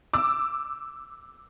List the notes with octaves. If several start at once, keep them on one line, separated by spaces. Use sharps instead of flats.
D6 E6